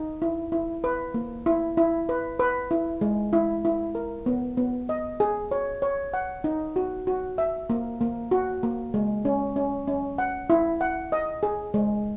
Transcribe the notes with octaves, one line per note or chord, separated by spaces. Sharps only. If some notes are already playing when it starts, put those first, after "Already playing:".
Already playing: D#4
E4
E4
B4
A#3
E4
E4
B4
B4
E4
G#3
E4
E4
A#4
B3
B3
D#5
G#4
C#5
C#5
F#5
D#4
F#4
F#4
E5
A#3
A#3
F#4
A#3
G#3
C#4
C#4
C#4
F#5
E4
F#5
D#5
G#4
G#3